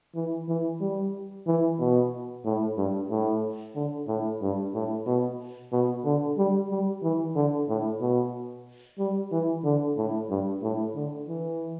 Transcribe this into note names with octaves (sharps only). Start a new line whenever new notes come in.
E3
E3
G3
E3
B2
A2
G2
A2
D3
A2
G2
A2
B2
B2
D3
G3
G3
E3
D3
A2
B2
G3
E3
D3
A2
G2
A2
D3
E3